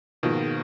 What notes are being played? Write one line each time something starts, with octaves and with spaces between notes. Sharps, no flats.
G#2 B2 D#3 F3 A#3 F4